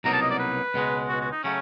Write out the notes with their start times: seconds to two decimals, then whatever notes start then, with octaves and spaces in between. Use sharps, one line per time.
0.04 C2 B2 F#3 A#3 D#4 A#5
0.13 A5
0.22 D#5
0.31 D5
0.39 B4
0.74 C#2 B2 G#3
1.09 F#4
1.21 F#4
1.32 D#4
1.44 C#3 F#3 A3 C#4